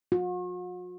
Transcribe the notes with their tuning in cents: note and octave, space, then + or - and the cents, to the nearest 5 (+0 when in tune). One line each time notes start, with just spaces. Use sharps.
F#4 -45